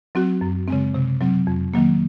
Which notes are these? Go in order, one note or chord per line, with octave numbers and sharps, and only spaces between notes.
F#3 C4 F#4
F#2
C#3 G#3 C4
C3
F#3 C4
F2
D#3 F#3 A#3